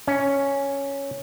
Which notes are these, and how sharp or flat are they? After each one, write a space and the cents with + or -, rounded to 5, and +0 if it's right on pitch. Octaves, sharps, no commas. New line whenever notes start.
C#4 +0